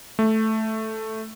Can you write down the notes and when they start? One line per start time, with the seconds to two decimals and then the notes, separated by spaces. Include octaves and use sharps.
0.19 A3